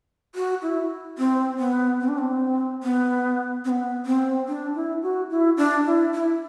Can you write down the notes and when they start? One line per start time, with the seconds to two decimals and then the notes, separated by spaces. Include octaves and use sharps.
0.35 F#4
0.62 E4
1.18 C4
1.59 B3
2.01 C4
2.08 D4
2.18 C4
2.83 B3
3.65 C4
3.70 B3
4.06 C4
4.48 D4
4.75 E4
5.02 F#4
5.30 E4
5.57 D4
5.86 E4
6.13 E4